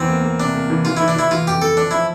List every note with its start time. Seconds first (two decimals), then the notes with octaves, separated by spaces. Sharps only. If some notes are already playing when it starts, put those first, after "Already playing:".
Already playing: E2 E3 C4
0.09 A#3
0.24 A#3
0.40 C3 D4
0.55 A#3
0.70 E3
0.85 E3 F4
0.97 E3 E4
1.08 D4
1.16 E3 E4
1.31 E3 F4
1.47 F2 G4
1.62 E3 A4
1.77 F3 D4
1.91 F3 E4